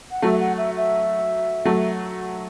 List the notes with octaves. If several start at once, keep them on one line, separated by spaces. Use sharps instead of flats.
F#5
F#3 A3 E5
F#5
E5
E5
F#3 A3